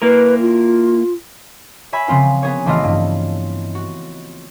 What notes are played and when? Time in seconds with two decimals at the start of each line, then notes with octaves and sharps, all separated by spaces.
0.02 A#3 E4 A#4 B4
0.40 F4
1.93 C#5 E5 G#5 B5
2.07 C#3 F3 C4 F4 B4
2.43 B3 G#4 C#5
2.66 A1 E3 A3 F4 D#5 F6
2.84 G2
3.75 F#4